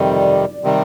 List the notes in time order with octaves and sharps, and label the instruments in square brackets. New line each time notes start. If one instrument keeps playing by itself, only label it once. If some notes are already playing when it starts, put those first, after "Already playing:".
Already playing: [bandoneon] F2 C3 D#3 G3 [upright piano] D5
[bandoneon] C3 D#3 G3